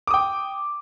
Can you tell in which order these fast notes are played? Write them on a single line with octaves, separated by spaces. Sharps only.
D6 D#6 G5